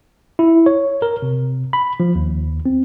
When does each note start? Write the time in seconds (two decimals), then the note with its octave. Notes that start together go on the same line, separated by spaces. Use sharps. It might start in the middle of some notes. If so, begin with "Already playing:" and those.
0.39 E4
0.66 C#5
1.02 A#4
1.22 C3
1.73 B5
2.00 F3
2.15 D#2
2.66 C4